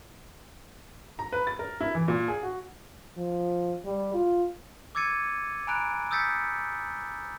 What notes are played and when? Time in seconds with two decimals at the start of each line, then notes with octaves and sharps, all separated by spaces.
1.19 A#5
1.32 B4
1.47 A6
1.59 A#4
1.81 E4
1.95 E3
2.08 A#2
2.28 G#4
2.43 F#4
3.17 F3
3.85 G3
4.14 F4
4.95 D6 E6 G#6 A6 C#7 D#7
5.67 G#5 A#5 B5 F#6 D7
6.11 D#6 E6 G6 A6 B6 C#7